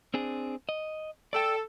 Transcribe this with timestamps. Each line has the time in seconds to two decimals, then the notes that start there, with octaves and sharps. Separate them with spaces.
0.14 C4 D4 G#4
0.69 D#5
1.33 A4 D5 G5